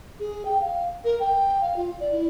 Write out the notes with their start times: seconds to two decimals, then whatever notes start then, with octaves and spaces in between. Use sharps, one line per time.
0.20 G#4
0.45 G5
0.61 F5
1.04 A#4
1.20 G5
1.61 F5
1.76 F4
2.00 D5
2.12 E4